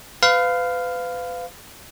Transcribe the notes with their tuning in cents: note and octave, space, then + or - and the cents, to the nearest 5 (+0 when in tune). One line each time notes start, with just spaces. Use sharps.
B4 +35 F5 +0